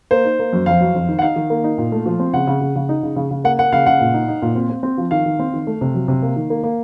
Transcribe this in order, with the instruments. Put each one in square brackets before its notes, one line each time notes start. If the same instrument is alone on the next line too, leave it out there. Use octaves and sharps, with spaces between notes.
[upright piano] A#3 [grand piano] C5
[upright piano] D#4
A#3
F#2
[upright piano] F2 [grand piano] F5
[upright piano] F#3
F2
D#3
[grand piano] F#5
[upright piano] D#4 [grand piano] F5
[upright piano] D#3
A#3
D#4
A#2
A3
F3
C4
[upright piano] C#3 [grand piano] F#5
[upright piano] C#3
C#3
C#3
D#4
C#3
C#3
C#3
[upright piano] A#3 [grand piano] F#5
[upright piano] A#3 [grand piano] F#5
[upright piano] C#3 [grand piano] F5
[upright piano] C#3 [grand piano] F#5
[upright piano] A#2
D#4
D#4
A#2
C4
C4
C4
F3
[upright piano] D#3 [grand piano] F5
[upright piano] D#3
C4
D#3
A3
C3
F#3
C3
A#3
D#3
A#3
A#3